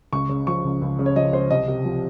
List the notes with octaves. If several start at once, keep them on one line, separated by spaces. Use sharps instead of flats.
C#2 C#6
C#3
F3 C#6
C#2
C#2
C#3
C#5
F3 D#5
C#2 C5
C2 D#5
C3
F3